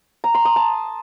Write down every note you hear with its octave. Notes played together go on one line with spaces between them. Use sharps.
A#5
C6
D#6
A5